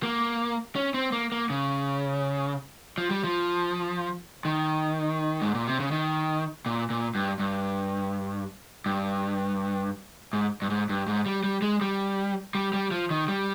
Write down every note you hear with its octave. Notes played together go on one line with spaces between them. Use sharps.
A#3
C#4
C4
A#3
A#3
C#3
F3
G3
F3
D#3
G#2
A#2
C3
C#3
D#3
A#2
A#2
G2
G2
G2
G#2
G2
G#2
G2
G#2
G3
G3
G#3
G3
G3
G3
F3
D#3
G3